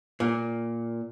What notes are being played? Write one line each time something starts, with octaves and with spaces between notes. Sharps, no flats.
A#2